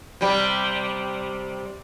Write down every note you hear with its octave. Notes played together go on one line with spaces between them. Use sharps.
C3 G3